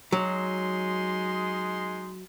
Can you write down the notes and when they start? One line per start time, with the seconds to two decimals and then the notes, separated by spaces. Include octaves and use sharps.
0.12 F#3 G#3 D#4 C6